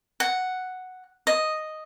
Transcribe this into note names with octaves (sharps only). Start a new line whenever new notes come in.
F#5
D#5